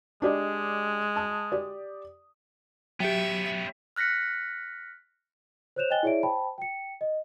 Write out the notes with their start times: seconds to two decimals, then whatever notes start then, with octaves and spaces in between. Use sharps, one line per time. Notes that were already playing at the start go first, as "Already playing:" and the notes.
0.22 G#3 D4 G4 D#5
1.16 A5 D#6
1.52 G4 D5
3.00 F#3 B3 C#4 G4 E5 G5
3.96 F6 F#6 A#6 B6 C#7
5.76 C5 C#5 F#6 G6 E7 F7
5.90 D#5 G5 G#5 F#6 A6 G7
6.03 E4 G#4 C#5 D5 E5 D7
6.23 C5 G5 A5 B5
6.58 G5 C#7
7.01 D#5